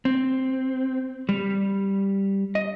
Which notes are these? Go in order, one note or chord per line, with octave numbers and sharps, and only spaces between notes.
C4
G3
D#5